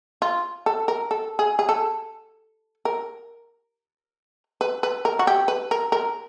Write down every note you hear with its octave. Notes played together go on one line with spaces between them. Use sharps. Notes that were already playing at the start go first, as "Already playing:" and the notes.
F4
A4
A#4
A4
G#4
G#4
A4
A#4
B4
B4
A#4
F#4
G4
B4
A#4
A#4